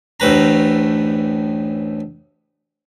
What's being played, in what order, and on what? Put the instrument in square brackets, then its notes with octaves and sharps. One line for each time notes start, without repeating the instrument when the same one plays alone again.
[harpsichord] A1 D2 A2 B4 A#5